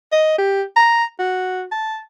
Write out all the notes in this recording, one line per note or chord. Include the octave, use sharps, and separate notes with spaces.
D#5
G4
A#5
F#4
A5